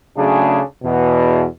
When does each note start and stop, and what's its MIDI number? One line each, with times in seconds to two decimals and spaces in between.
0.17 0.60 49
0.17 0.60 54
0.17 0.60 57
0.17 0.60 62
0.17 0.60 68
0.84 1.45 40
0.84 1.45 47